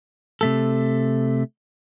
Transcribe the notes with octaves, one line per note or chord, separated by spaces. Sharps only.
C3 A3 A4